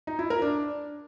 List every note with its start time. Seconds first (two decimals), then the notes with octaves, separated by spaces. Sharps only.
0.07 D#4
0.19 E4
0.30 A#4
0.42 D4